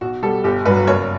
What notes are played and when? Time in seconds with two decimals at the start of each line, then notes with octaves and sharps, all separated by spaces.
0.01 B1 F#4
0.22 B2 G3 A4
0.44 G1 G4
0.65 G2 F#3 B4
0.87 F#1 C#5